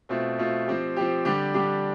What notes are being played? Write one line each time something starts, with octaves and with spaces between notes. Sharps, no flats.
B2 A3 C4 F4
B2 A3 C4 F4
F3 C4 G4
F3 C4 G4
D3 G3 D4 G4
D3 G3 D4 G4